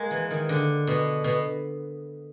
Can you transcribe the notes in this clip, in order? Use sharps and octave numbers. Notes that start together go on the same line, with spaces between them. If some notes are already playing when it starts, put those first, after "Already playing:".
Already playing: G#3 A#3
E3
D#3
D3
B2
B2